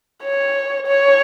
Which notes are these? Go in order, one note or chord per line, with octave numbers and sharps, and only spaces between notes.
C#5
C#5